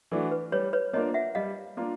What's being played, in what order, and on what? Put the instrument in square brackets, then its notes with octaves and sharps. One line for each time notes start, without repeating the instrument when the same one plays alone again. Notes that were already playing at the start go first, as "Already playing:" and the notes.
[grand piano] E3 A3 D4 F#4
[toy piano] B4
[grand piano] G3 [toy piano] B4 C#5
[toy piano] B4 C#5
[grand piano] A#3 D4 F4 A#4 [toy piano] C#5 D#5
[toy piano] E5 F#5
[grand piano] G3 [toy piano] D#5 F5
[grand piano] A#3 D4 F4 A#4